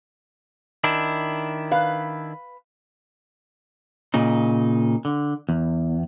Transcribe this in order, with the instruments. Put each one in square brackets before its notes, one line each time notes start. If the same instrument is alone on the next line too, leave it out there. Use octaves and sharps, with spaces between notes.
[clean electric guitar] D#3 D4 E4
[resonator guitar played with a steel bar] B4 F5
[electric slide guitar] A#2 C#3 D#4
D3
E2